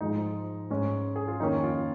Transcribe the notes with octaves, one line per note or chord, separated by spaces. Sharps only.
G#2 F3 G#3 D#4
G#2 G#3 C#4
G#4
F4
F2 D#3 A#3 C#4 D#4
F4